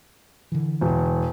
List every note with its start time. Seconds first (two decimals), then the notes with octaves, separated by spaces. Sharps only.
0.52 D3 E3
0.81 E1